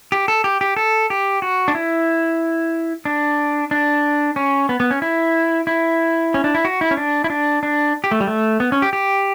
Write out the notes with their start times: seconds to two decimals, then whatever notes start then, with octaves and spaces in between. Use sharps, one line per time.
0.12 G4
0.28 A4
0.44 G4
0.61 G4
0.76 A4
1.10 G4
1.42 F#4
1.68 D4
1.75 E4
3.05 D4
3.71 D4
4.36 C#4
4.69 B3
4.80 B3
4.91 C#4
5.02 E4
5.67 E4
6.34 C#4
6.44 D4
6.55 E4
6.65 F#4
6.81 E4
6.91 C#4
6.97 D4
7.24 E4
7.30 D4
7.63 D4
8.04 G4
8.11 A3
8.20 G3
8.27 A3
8.60 B3
8.72 C#4
8.82 G4
8.93 G4